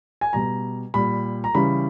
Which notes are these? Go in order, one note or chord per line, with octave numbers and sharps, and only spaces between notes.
G#5
B2 G3 A#5
A#2 G3 B5
A#5
C#3 E3 G3 B5